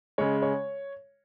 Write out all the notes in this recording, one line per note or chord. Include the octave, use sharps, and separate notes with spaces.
C#3 G#3 C#5
C#5